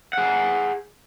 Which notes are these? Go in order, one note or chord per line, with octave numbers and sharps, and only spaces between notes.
G#4 F#5